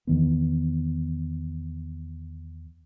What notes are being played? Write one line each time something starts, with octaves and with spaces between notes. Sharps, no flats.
E2 D#3 B3